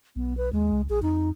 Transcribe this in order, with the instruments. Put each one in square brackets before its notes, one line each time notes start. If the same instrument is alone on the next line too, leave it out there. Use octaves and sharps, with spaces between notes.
[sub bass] B1 [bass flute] B3
[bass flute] B4
[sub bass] D#2 [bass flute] G#3
[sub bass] C#2
[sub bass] A#1 [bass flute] G#4
[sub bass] F2 [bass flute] D#4